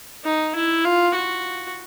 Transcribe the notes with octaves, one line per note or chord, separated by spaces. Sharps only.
D#4
E4
F4
F#4